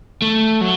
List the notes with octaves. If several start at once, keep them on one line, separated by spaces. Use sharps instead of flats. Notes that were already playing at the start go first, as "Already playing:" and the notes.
A3
F#3